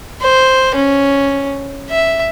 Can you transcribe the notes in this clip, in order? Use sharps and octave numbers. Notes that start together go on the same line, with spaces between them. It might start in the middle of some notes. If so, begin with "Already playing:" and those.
C5
C#4
E5